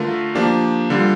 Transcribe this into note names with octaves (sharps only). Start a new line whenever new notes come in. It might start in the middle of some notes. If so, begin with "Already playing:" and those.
Already playing: D3 A3 D4 F4 A#4
F3 A#3 D4 G4
D3 G3 D4 F4